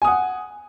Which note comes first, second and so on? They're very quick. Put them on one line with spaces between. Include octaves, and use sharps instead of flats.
G#5 D#6 F#5